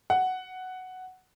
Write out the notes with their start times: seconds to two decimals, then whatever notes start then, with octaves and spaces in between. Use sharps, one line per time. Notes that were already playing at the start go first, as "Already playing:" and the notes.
0.10 F#5